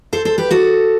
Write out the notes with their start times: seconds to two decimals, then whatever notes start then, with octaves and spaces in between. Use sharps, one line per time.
0.13 A4 C5
0.25 A4 C5
0.38 G4 B4
0.51 F#4 A4